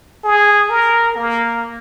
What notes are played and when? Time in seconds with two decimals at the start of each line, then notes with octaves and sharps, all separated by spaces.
0.24 G#4
0.70 A#4
1.16 A#3